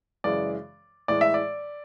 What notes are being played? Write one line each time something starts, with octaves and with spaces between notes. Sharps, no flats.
F#2 C#3 E3 G#3 D5
A2 E3 G#3 D5
E5
D5